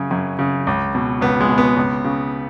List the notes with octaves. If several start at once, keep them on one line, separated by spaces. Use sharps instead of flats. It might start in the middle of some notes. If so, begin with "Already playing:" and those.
Already playing: F#2 C#3 C#4
F#2
C#3
C#2
B2
C#2 B3
G#3
B2
B3
C#2
C#3